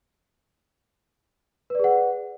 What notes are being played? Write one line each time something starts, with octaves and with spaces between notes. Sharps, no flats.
G#4 B4 D5 F#5